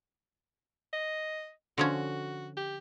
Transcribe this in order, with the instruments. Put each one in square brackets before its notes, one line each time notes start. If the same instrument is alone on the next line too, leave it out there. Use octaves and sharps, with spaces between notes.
[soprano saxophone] D#5
[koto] D3 F3 C#4 [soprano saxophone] F#4
[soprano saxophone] G4